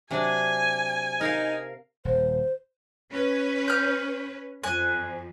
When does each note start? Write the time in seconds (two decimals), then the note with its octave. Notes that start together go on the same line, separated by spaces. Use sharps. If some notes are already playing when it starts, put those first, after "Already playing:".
0.11 C3 F#3 D4 G#5
1.21 D#4 A#4 F5
2.05 D#1 C5
3.10 C#4 B4
3.68 F6 G6
4.64 F2 G#5 F#6